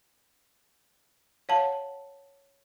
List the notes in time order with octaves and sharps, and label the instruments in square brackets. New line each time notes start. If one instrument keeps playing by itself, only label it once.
[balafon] C#5 F5 F#5 A5